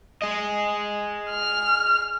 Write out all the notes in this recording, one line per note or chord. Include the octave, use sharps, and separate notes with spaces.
G#4 D#5
F6